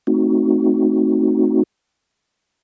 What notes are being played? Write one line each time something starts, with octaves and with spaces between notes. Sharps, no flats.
A3 C4 D#4 F#4